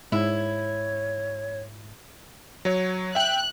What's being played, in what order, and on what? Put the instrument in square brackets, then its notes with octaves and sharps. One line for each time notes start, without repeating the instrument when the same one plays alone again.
[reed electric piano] G#2 [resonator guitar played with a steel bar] E4 [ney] C#5
[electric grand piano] F#3 C#5
[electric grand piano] E5 G5 [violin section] F#6